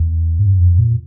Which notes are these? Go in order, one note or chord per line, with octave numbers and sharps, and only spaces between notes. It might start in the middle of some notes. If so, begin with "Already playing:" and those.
Already playing: E2
G#2
G2
F#2
F2
A#2